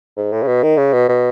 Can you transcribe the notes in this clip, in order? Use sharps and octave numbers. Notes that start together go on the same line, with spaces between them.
G#2
A2
C#3
B2
D#3
C#3
B2
B2